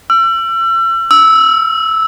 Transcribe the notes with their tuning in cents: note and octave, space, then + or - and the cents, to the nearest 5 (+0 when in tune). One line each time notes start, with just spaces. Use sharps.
E6 +35
E6 -10